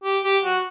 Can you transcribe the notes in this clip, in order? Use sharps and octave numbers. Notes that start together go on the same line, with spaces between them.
G4
G4
F#4